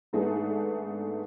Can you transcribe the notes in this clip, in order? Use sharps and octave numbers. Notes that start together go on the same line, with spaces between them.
G#2 D#3 A3 B3 D4 G#4